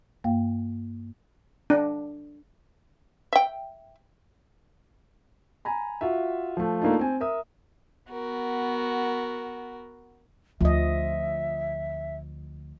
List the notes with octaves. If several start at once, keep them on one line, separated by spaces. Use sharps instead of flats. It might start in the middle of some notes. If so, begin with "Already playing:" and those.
G2 A#3 F5 G5
D4
E5 G5
G#5 A#5 B5
F4 F#4 E5
F3 A3
A3 A#3 D4 D#4 F4
C4 G#5
A#4 E5 D#6
B3 F#4 A#4
D2 F3 D#5 E5